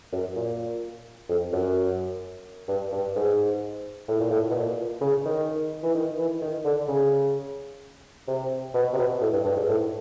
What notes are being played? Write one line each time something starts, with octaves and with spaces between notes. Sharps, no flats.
F#2
A#2
F2
F#2
G2
G2
G#2
A2
A#2
A2
B2
A#2
C#3
D#3
E3
D#3
E3
D#3
D3
C#3
C3
B2
C3
B2
A2
G2
G2
G#2
A2